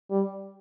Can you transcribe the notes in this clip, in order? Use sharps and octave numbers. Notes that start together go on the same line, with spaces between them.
G3